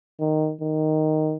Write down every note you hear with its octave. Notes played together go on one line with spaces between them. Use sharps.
D#3
D#3